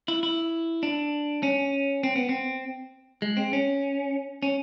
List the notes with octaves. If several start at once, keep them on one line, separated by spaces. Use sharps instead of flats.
E4
E4
D4
C#4
C4
B3
C4
G#3
C4
C#4
C#4